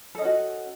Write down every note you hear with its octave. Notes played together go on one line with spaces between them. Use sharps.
C#4 F#4 A4 D#5